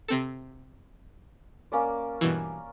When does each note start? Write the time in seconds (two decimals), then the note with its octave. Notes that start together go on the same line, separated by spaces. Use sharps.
0.08 C3 C4 A4
1.72 A#3 C#4 D5
2.21 G2 B2 E3